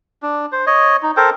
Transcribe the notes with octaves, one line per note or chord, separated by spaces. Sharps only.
D4
C5
C#5 D#5
D#4
A4 A#4 C5 G5